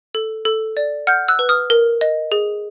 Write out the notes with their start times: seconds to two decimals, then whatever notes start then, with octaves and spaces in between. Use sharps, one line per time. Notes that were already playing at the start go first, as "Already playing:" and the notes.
0.15 A4
0.45 A4
0.77 D5
1.07 F#5 F6 G6
1.28 E6 F#6
1.39 B4
1.49 D#6 F6
1.70 A#4
2.01 D#5
2.32 G#4